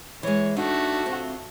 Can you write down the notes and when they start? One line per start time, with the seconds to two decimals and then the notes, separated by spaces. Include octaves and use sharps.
0.23 E3 G#3 C#5
0.56 A3 D4 D#4 F#4 A4
1.06 C3 C4 F4